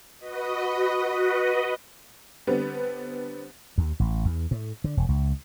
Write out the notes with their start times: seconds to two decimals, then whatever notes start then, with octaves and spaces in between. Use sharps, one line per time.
0.19 F#4 B4 D#5
2.47 D3 G3 B3 C4
3.78 D#2
4.00 A1
4.25 E2
4.51 A2
4.84 D3
4.97 E1
5.09 C#2